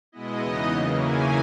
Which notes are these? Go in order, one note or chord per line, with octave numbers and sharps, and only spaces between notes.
B2 G#3 B3 E4 D#5
E2 C#3 E3 B3 D#4
C#3 F#3 A#3
C#3 E3 A#3 C#4 E4 G#5